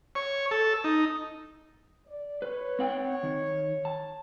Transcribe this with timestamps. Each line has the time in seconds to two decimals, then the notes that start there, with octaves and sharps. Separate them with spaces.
0.15 C#5
0.51 A4
0.84 D#4
2.06 D5
2.42 B4 C#5
2.79 C4 F#5 G5
3.23 D#3
3.85 A5